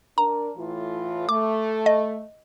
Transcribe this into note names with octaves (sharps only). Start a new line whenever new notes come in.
D4 A#4 A#5
A2 E3 F4
A3 D6
D#5